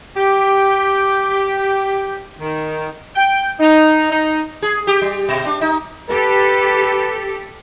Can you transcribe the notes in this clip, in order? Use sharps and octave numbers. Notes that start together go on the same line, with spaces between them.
G4
D#3
G5
D#4
D#4
G#4
G4
G3
B2
D4
D#4
G4 A4 B4